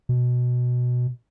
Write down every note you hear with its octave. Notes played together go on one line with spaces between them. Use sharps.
B2